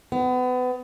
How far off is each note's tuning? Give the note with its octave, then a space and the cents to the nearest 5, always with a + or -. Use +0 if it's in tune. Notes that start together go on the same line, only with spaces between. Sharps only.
B3 +30